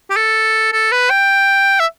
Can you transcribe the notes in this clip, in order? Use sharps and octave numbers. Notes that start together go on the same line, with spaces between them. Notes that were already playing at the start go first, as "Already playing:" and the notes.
G4
A4
A4
B4
G5
E5